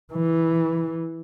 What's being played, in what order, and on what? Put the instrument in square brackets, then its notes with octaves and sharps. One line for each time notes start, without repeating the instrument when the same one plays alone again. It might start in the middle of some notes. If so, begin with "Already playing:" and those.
[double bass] E3